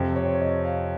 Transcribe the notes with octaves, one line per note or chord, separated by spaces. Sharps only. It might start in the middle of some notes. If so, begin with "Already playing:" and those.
Already playing: F2 C3 F3 C4 C5
C#5
C#5
D#5
F5